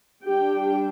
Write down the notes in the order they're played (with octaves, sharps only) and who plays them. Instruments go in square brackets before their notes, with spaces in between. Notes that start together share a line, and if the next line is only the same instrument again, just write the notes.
[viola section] G3 D4 G4 G5